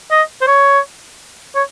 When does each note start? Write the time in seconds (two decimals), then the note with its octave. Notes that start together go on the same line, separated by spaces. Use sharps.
0.11 D#5
0.42 C5
0.47 C#5
1.56 C#5